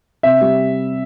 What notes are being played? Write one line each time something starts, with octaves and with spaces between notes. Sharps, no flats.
C3 E5
G3